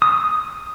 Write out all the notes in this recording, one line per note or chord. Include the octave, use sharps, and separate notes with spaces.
D#6